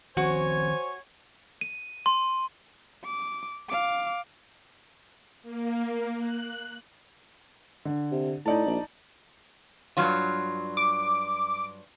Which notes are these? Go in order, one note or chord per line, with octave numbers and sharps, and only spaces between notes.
D#3 F3 C4 F#4 C5 C#5 G#5
D#7
C6
D6
F5 D6
A#3
F#6
D3
C3
A2 D#4 D5 A5
A#1
G2 F#3 F4
D6